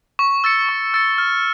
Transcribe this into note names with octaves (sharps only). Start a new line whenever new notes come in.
C#6
E6 A6 C#7
C#6
E6 A6 C#7
F6